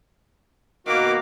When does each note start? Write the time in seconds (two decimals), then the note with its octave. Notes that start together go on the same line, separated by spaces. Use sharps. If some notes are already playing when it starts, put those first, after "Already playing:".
0.87 B2 D#3 A#3 F#4 D6